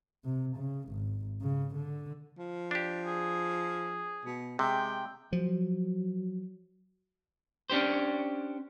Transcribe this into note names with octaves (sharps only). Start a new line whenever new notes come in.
C3
C#3
G#1
C#3
D3
F3
D4 G4
G#4
B2
C3 G#3 G5
F3 F#3
C#4 D4 G4 C5